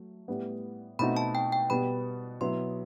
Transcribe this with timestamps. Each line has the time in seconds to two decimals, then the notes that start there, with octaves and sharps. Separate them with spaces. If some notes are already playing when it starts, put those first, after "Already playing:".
Already playing: F#3 A3
0.28 A2 G3 B3
0.99 B2 A3 C4 D#4 F#4 B5
1.17 A5
1.35 G5
1.52 G5
1.70 B2 G3 B3 B5
2.41 B2 F#3 B3 E4 C6